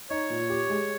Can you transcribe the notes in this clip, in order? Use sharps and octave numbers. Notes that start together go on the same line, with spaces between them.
D#4 C#5
A#2
G4
G#3